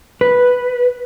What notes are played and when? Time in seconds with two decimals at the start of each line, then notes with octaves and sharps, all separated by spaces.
0.21 B4